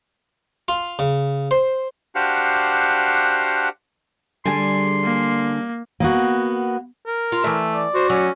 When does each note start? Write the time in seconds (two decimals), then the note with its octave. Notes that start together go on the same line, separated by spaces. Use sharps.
0.68 F4
0.99 C#3
1.51 C5
2.15 D4 F#4 G4 C5 F5 F#5
4.45 D3 G3 G#4 D5 G#5 C6
5.03 A#3
6.00 A#3 B3 F#4
7.07 A#4
7.32 F4
7.44 E3 A3 E5
7.74 D5
7.95 F#4 C5
8.10 F#3 C#4